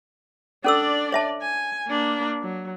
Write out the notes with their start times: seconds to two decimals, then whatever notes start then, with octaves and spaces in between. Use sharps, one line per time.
0.64 C#4 D4 A4 D5 E6
1.12 C#5 E5 A5
1.42 G#5
1.88 A#3 D4
2.42 F#3